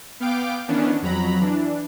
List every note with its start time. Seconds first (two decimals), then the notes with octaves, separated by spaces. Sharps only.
0.20 B3 F5 G5 D6 D7
0.68 D#3 E3 B3 C#4 D4
1.02 F2 F#3 A#5 B5
1.41 E3 D4